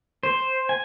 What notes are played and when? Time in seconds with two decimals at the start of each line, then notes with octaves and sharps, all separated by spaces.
0.23 C5
0.69 G#5